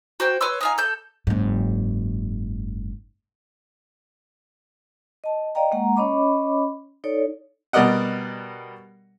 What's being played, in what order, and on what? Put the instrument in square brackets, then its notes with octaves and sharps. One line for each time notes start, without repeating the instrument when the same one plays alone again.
[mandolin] F#4 C5 G5
B4 C#5 C6 E6
D#4 F4 G#5
A4 G6
[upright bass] F#1 G#2
[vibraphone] D#5 A5
D5 D#5 F5 G5 A#5
G#3 A#3 F#5 A#5
C#4 C#5 D#5 B5 D6
D#4 A4 C#5 D5
[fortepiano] B2 G3 A#4 D5 D#5 F#5